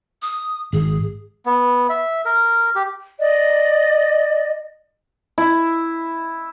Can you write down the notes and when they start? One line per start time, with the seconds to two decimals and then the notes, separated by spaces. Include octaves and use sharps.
0.22 D#6
0.73 G#1 G#4
1.46 B3
1.89 E5
2.25 A#4
2.75 G4
3.18 D5 D#5
5.38 E4